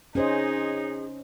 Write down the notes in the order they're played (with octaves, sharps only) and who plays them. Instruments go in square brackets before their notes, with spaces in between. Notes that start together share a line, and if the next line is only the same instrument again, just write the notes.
[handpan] C#4 C5 D#5 [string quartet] D#4 [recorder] G#4